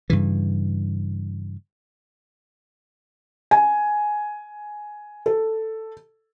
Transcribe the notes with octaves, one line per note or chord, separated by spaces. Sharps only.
G2 C#3 E3
G#5
A4